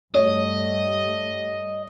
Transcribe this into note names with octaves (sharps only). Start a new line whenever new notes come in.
G2 G3 A3 C#5 D#5